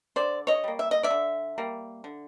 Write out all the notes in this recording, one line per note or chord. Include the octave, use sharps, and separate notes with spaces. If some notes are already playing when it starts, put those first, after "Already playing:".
D3 C5 D5
C#5 D#5
G3 A#3
E5
D#5
D5 E5
D3
G3 A#3
D3